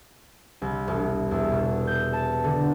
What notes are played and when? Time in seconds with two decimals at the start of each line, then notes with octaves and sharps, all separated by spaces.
0.62 C2
0.88 E1
1.31 E2
1.52 B2
1.87 G6
2.13 A5
2.44 D3